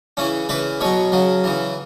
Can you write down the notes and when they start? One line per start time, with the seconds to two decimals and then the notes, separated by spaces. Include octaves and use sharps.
0.17 C#3 E3 C#4
0.49 C#3 E3 B4
0.81 B2 F#3 C#5
1.12 C#3 F#3
1.44 C#3 E3